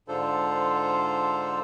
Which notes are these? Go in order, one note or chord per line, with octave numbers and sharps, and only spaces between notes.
G#2 D3 D4 F4 A4 C5